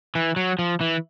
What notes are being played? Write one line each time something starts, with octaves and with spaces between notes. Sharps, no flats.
E3
F#3
F3
E3